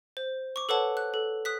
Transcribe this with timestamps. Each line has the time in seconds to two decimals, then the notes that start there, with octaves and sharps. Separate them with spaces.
0.17 C5
0.56 C#6 D6
0.69 A4 B4 C#5 F#5 A5
0.97 F#6
1.14 A4
1.45 D#6 F#6 B6